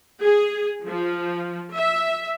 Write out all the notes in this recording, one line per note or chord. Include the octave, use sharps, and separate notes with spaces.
G#4
F3
E5